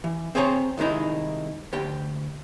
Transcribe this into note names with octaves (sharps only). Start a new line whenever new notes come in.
E3
C4 G#4 C5 C#5 G#5 A#5
C2 D#3 G#3 D#4 E4
D2 G4 G5